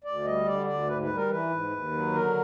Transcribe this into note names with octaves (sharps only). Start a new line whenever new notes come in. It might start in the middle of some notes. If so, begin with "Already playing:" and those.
D2 D5
G3 D#5
D3 D5
D2 D5
G#2 B4
B4
G3
A#4
E3 B4
G#2
D#2
F#3
D3 A#4